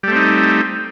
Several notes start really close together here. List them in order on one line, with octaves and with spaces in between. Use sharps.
G3 A3 C4 D#4